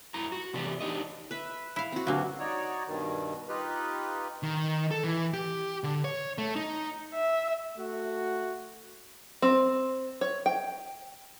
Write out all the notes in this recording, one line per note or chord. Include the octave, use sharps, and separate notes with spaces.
F#2 E4 A#5
F#4
C3 E3 B3 G4 D5
D4 D#4 G4 D#5
B4 E5
E4 F5
C4 F#4
D2 G2 F#3 A#3
D#4 F#4 C#5 D5
G2 B2 D#3
D#4 F4 G4 B4
D#3
A4
E3
G4
D3
C#5
A3
D#4
E5
A3 F#4
C4
C#5
G5